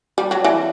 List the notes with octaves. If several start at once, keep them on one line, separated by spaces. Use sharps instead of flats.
G3
F#3
E3